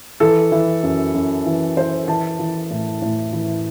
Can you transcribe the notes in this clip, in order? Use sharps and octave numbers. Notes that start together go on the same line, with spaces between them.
E3 A4
E3
F#2
F#2
E3
E3 C5
E3 A5
E3
A2
A2
E3